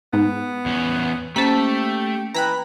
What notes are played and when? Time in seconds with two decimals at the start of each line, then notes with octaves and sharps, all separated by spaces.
0.13 G#2 B3
0.66 E2 C#4
1.36 A3 A#3 C#4 G4 C5 A5 B6
2.34 E3 B4 G5 A#5 B5 F#6